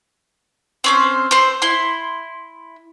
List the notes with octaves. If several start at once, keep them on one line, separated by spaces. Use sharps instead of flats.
C4 C#4 C5
C4 C5
E4 C6